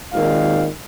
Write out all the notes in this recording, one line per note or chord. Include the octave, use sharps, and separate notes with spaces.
G#1 A#2 D#3 F5